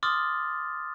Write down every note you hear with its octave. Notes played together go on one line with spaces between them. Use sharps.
C6 D6 D#6 F6 A6